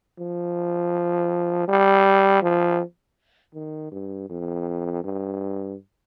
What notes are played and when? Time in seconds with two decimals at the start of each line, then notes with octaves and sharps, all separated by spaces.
0.19 F3
1.68 G3
2.42 F3
3.54 D#3
3.92 G2
4.29 F2
5.04 G2